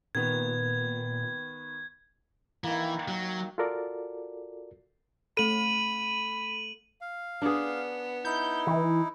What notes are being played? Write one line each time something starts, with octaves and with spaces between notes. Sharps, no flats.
A#2 D#3 B3 G#6
D#3 E3 A#3
F#3
F4 F#4 A4 A#4 D5
A3 A4 B5 D#7 F#7
F5
B3 D4 G#4
D#4 E4 G6
E3